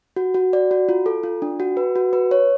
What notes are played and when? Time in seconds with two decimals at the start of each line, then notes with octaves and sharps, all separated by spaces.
0.16 F#4
0.34 F#4
0.53 D5
0.71 F#4
0.89 F4
1.06 A4
1.23 F4
1.42 D4
1.60 F#4
1.77 B4
1.96 F#4
2.13 B4
2.31 C#5